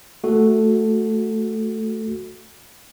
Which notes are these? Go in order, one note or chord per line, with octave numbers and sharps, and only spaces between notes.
A3 F#4 A4